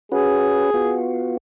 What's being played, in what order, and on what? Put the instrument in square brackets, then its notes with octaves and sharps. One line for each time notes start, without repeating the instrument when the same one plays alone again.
[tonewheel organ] C#4 F#4 B4 [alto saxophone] G#4
[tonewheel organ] B3 F4 F#4